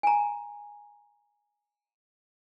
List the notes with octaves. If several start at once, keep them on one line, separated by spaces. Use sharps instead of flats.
G#5 A#5